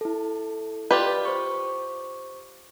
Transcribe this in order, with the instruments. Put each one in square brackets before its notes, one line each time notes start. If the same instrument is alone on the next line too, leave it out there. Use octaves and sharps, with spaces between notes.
[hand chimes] E4 A4
[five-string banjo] F4 G4 B4 [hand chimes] D5
[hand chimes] C5 C#6